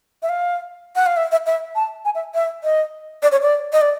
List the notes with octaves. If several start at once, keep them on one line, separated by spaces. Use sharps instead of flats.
E5
F5
F#5
F5
E5
E5
E5
A5
G#5
E5
E5
D#5
D5
C#5
D5
D#5
D5